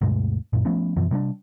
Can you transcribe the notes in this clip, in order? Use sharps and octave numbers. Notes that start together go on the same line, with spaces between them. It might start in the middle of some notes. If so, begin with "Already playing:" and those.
D2 G2 B2 G#3
F#2 A#2
F3 A3 B3 C#4
F#2 B2 E3 F3
C3 G3 C#4 D4